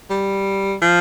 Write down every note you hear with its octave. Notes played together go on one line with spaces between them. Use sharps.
G3
F3